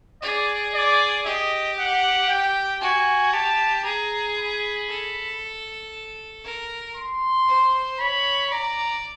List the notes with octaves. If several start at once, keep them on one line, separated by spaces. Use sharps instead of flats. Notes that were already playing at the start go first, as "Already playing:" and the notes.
G#4 D5
D5
G4 D#5
F#5
G5
F#4 G#5
G4 A5
G#4 A#5
B5
A4
A#4
C6
C5
C#5 B5
D5 A#5